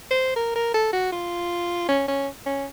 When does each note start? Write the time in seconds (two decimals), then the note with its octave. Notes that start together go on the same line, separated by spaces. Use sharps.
0.11 C5
0.36 A#4
0.55 A#4
0.74 A4
0.93 F#4
1.12 F4
1.88 C#4
2.08 C#4
2.46 C#4